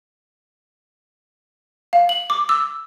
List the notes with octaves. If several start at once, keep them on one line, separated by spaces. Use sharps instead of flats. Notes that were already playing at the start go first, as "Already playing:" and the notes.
F5
F#7
D6
E6